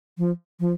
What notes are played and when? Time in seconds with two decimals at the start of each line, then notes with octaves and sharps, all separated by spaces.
0.18 F3
0.60 F3